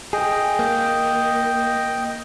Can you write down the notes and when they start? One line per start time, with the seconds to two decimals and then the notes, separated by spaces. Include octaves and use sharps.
0.13 G#4 D#5 G5
0.59 A#3